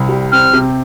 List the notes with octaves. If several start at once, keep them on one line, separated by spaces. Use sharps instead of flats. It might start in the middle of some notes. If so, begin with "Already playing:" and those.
Already playing: C2
G3
C4 F6
C3